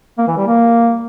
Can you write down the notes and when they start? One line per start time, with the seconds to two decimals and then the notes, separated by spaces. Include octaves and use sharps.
0.18 A#3
0.27 E3
0.37 G3
0.46 A#3